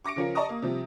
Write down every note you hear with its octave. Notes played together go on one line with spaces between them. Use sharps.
C#6 D6 A#6 C#7 D7
C#3 F3 C#4 F4 A#4
D5 D#5 A5 A#5 C#6 D#6
A#3
C3 F3 G3